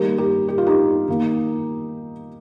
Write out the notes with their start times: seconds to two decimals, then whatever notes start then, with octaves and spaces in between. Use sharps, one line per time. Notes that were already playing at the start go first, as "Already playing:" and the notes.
Already playing: D#3 G3 A#3 G4 A#4
0.18 G4 A#4
0.48 G4
0.58 F4
0.66 D#4 G4
1.08 D#3 A#3